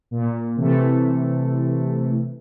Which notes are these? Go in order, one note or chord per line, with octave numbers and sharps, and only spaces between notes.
A#2
C3 E3 A3